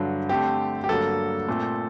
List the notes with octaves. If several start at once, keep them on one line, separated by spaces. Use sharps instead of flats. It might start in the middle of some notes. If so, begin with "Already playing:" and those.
Already playing: G2 D3 F#3
D3 A3 C4 G4
G4
G2 D3 F#3 A#3 A4
A#2 A3 C4